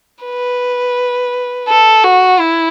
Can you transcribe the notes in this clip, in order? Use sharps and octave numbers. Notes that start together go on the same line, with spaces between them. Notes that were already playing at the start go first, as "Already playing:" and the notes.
B4
A4
F#4
E4